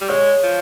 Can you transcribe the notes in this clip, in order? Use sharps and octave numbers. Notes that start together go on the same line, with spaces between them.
G3
G#3 C#5
F3